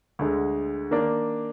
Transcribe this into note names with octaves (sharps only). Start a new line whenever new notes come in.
D2 D3 G#3
D#3 A#3 D4